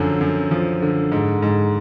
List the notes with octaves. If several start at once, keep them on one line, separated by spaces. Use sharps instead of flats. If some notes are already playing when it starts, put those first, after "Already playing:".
Already playing: F#2 D3 F3
F#2
F3
D3
G#2
G#2